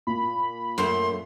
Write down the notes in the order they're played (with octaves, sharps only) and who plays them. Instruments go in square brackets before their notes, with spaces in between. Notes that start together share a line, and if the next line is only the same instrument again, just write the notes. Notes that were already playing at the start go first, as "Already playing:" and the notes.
[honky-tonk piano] A#2 [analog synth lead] B5
[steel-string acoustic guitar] F#2 A3 [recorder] C6